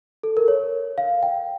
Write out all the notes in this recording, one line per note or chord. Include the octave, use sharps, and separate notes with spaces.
A4
A#4
C#5
F5
G5